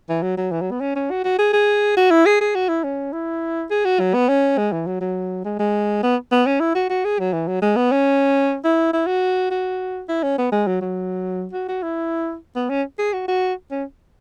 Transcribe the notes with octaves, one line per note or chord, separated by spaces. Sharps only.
E3
F#3
F#3
E3
F#3
B3
C#4
C#4
F#4
F#4
G#4
G#4
F#4
E4
G#4
G#4
F#4
E4
C#4
E4
G#4
F#4
F#3
B3
C#4
G#3
E3
F#3
F#3
G#3
G#3
B3
B3
C#4
E4
F#4
F#4
G#4
F#3
E3
F#3
G#3
B3
C#4
E4
E4
F#4
F#4
E4
C#4
B3
G#3
F#3
F#3
F#4
F#4
E4
B3
C#4
G#4
F#4
F#4
C#4